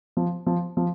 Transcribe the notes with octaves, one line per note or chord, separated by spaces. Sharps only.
F3
F3
F3